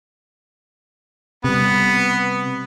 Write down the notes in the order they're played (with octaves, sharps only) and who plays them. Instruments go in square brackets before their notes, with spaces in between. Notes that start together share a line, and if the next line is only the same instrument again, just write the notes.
[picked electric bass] C3 G3 [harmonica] B3